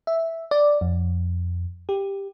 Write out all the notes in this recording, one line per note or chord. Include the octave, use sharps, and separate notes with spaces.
E5
D5
F2
G4